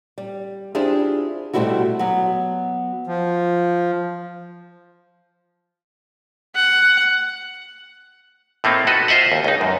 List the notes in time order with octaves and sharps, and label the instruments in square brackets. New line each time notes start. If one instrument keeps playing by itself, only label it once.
[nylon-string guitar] G3
C4 D4 E4 F4 G4 G#4
B2 G3 A3 C4 E4 F#4
F#3 B3
[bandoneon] F3
[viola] F#5
[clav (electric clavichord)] A2 A3 A#3 C4 D#4
F#4 A4 B4 D#5
F4 C5 D#5 E5 F#5
D#2
C#2 D#4
F#2